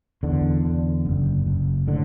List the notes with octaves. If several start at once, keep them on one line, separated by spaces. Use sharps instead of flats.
E2 D3
D3
F#1
F#1
A2 D3